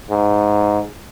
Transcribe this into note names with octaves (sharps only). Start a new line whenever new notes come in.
G#2